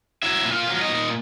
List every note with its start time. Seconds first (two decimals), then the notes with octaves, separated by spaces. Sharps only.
0.23 F#3 E4 E5
0.45 A#2
0.52 F4 F5
0.67 F#3
0.81 D#4 D#5
0.89 A#2